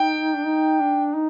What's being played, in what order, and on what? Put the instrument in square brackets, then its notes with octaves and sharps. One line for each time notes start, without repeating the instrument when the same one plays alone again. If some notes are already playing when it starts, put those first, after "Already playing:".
Already playing: [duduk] D#4 [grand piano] G5
[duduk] D4
D#4
D4
D#4